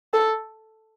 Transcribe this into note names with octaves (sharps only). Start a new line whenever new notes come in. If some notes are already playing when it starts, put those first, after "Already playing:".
A4